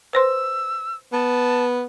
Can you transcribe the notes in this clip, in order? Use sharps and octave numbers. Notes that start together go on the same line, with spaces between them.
B4 C5 C6 E6
B3 A5